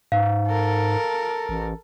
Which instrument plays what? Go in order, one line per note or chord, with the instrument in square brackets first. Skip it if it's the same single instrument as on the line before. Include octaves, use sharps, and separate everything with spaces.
[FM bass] G#2 [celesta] F5
[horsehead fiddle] A4 A#4
[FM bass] A1